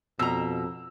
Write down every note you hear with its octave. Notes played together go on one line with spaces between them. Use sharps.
F2 B2 A#5 E6